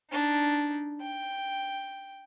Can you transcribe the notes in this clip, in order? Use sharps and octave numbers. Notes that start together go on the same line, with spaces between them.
D4 D#4
G5